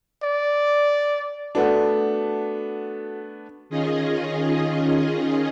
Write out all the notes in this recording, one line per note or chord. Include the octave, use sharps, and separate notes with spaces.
D5
A3 B3 D4 F#4 A4 F#5
D#3 C#4 F4 G#4 D#5